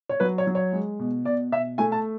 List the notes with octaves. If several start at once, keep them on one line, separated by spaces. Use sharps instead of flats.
C#5
F#3 B4
C#5
F#3
C#5
G#3
B2
B2 D5
B2 E5
A3 G#5
A5